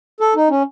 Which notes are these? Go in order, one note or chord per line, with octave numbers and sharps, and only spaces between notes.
A4
D#4
C#4